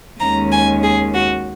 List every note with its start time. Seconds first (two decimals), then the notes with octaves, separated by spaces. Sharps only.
0.19 D#2 D#3 G#3 C#4 A#5
0.51 G#5
0.83 G#4
1.13 F#4